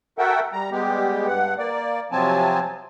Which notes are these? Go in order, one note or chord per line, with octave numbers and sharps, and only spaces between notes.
F#4 A4 A#4 E5 F#5 G5
G3 A#5
G3 G#3 B3 G4
G2 F#5
A#3 D5
C3 F3 F#3 C4 G#5 A5